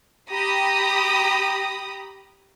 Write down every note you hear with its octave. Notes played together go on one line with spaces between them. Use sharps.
G4 A#5 B5 D#6